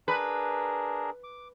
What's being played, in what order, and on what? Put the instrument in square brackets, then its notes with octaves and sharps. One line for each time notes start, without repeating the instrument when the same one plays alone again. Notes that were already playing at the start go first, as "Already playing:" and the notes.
[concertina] D4 G#4 A#4 [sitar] B4
[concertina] D6